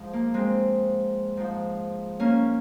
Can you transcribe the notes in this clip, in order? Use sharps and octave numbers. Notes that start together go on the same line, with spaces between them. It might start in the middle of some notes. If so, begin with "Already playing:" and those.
Already playing: G#2 F3
A#3
G#3 C4
G#2 F3
A#3 C#4